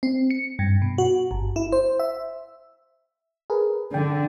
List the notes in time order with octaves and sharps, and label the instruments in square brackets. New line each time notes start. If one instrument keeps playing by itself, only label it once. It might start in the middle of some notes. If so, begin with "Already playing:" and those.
[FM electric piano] C4
C#7
G2
B2
F#4
G1
E4
C5
E5
G#4 A#4 B4
[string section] D3 [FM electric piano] G5